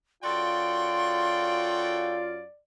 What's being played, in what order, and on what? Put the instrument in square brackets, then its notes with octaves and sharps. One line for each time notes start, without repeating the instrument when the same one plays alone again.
[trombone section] F#2 F4 [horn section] F#4 A4 G5 [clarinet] D5 [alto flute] C6